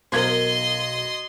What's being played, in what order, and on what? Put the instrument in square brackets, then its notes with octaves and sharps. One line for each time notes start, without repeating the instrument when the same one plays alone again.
[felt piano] B1 G#6 [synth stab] A#4 C5 [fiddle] D#5 C6